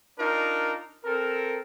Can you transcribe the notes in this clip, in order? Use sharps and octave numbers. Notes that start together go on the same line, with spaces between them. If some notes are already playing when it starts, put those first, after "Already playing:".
D4 D#4 F4 A#4
C4 A4 A#4